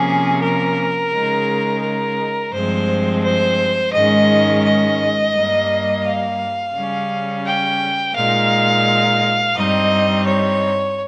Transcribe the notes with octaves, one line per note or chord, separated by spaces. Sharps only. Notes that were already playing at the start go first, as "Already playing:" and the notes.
Already playing: C3 F3 A#3 C#4 G#4
A#4
C#3 G#3 D#4
A#4
G2 F3 G#3 C4 C5
C5
G#2 D#3 G#3 C#4 D#5
D#5
G2 G3 A#3
F5
C#3 G3 C#4
G5
A#2 G#3 D#4 F5
G2 G3 C4 D#4 D#5
C#5